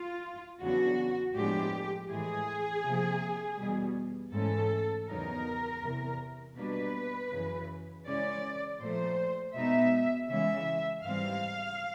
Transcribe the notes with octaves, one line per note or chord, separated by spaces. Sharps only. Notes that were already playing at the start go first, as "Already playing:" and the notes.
Already playing: F4
E2 C#3 F#3 B3 D4 F#4
A2 F3 G#3 B3 D4 G4
A2 E3 G#3 G#4
C3 F3 A#3
E2 B2 G3
G#2 E3 A3 C#4 A4
E2 C#3 F#3 B3 D#4 A#4
E2 C3 E3
B2 G3 A#3 D4 B4
F#2 C#3 E3
C#3 E3 G#3 C#4 D5
A#2 F3 A3 C5
B2 G#3 B3 D#4 E5
C#3 E3 G#3 C#4 E5
G#2 E3 G3 C4 F5